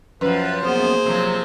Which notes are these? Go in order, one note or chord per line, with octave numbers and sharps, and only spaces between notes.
F#2 F3 B4
A#3 B3 G#4 C5
C3 F3 F#3